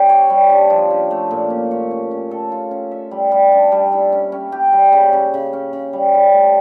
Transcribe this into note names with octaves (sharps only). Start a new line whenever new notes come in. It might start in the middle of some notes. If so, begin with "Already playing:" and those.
Already playing: C#4 G4 D5
C#5
G3
D4
F3
C#4
A3
A#2
C#4
C#5
C#4
C#4
A4
F4
C#4
E5
G3
G3
D4
G3
E4
C#4
C#4
G4
G3
C#3
C#3
C#3
C#4
C#3
G3
G3
A3